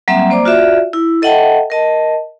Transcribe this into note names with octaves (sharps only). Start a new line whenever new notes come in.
F#3 G3 A#3 C4 E5
A#3 C5 D5 D6
F4 F#4 D5 E5
E4
A4 D#5 E5 F#5 G5 A5
A#4 D#5 A5